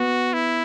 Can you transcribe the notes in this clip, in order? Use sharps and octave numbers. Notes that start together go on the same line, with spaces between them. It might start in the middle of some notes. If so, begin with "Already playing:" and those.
Already playing: B3 F#4
E4